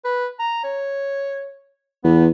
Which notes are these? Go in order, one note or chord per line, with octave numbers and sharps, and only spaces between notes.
B4
A#5
C#5
E2 B3